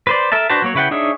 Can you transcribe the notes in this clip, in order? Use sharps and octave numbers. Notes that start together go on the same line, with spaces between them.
B4 C5 D5
A4 A#4 E5 A5
D4 F#4 B4 C5 A5
F#3 A#3 C#5
C#3 E4 B4 F#5 G5
D4 D#4 G#4 C#5 E5